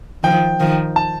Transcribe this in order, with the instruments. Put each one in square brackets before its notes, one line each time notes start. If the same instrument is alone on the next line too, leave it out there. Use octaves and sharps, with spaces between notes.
[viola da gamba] D#3 F3 [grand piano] G5
[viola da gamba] D#3 F3
[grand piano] A5